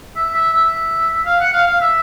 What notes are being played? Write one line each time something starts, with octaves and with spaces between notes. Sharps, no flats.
E5
E5
E5
F5
F#5
F5
F5
E5